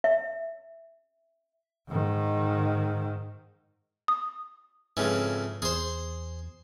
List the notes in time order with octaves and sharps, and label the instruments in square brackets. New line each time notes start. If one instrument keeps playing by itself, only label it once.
[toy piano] E5
[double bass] G#2 D#3
[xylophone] D#6
[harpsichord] F2 C#3 E3 [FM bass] G#2
[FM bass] E2 [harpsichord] G#4 C5